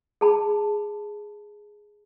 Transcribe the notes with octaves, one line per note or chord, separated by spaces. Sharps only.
G#4 A5 B5